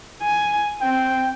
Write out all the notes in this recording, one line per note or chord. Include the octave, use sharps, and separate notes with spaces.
G#5
C4 G5